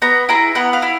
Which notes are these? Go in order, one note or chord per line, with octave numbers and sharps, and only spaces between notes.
B3 A#5
E4 G#4 A#5
B3 F#5
F5
E4